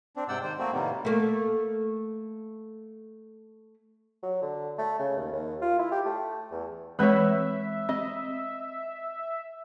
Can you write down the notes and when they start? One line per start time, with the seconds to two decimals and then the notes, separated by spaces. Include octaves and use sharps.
0.16 C4 D4
0.28 G#2 C3 D5 F#5 G5 E6
0.43 D#3 C5
0.59 A3 A#3 C4 F#4
0.72 A2 C3 D#3 G3 A#3 B3
1.05 A3 A#3
4.23 F#3
4.42 D3
4.78 A3
4.99 C#3
5.16 D#2
5.32 D#2
5.61 F4
5.79 E4
5.92 G4
6.05 A3
6.51 E2
6.99 E3 G#3 C4 B4 C#5 E5
7.89 C4 D#5